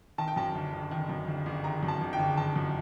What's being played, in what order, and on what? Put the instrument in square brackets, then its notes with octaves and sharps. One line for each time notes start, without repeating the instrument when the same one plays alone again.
[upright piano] D#3 A5
G5
F#2 A5
G1
G1
D#3
F#2
G1
G1
D#3 A#5
F#2
A5
G1
G5
G1
D#3 A5
F#2